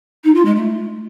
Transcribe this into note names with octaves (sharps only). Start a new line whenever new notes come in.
D#4
F4
G#3
A3